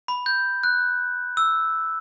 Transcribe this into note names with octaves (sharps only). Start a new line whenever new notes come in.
B5
G6
F#6
E6